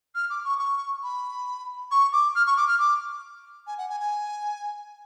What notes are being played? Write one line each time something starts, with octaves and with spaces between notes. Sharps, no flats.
F6
D6
C#6
C#6
B5
C#6
D6
F6
C#6
D6
F6
D6
G#5
F#5
G#5
G#5